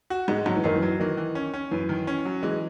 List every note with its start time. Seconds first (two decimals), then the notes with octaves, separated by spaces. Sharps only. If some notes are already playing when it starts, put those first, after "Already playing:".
0.10 F#4
0.28 G#2 G#3
0.46 G#2 F#3
0.56 E3
0.64 F#2 D#3
0.75 E3
0.82 F#3
0.99 D#3 E3
1.17 E3
1.35 C#4
1.54 C#4
1.71 F#2 E3
1.89 D#3
2.07 C#4
2.25 F#3
2.43 E3 G#3